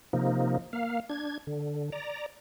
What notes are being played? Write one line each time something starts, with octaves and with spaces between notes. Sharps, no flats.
C3 F3 A#3 D#4
A#3 F5
D4 G#6
D3
D5 A#5